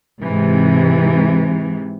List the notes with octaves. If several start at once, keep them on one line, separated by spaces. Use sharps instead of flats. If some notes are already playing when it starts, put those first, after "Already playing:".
G#2 C3 E3